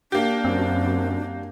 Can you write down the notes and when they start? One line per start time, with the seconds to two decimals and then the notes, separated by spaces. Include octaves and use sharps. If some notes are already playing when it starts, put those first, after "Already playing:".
0.12 A#3 D4 G4
0.45 F#2 C4